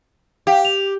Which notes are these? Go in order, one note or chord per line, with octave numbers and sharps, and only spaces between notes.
G4 F5 G5
F7